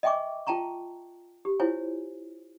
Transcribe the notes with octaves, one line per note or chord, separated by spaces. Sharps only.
D#5 E5 G5 G#5 C#6 D6
F4 G5 A5 A#5 C#6
G4
E4 F4 C5 C#5 G#5